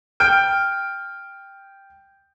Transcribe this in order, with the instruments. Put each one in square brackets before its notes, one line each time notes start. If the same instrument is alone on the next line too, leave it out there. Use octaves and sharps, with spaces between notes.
[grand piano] G5 G6 D7 [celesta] F6